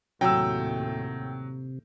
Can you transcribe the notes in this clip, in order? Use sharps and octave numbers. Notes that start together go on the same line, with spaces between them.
D#2 A2 C3 F#3 G5 E6